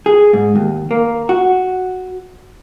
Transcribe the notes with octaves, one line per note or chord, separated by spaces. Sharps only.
G#4
G#2
D#2
A#3
F#4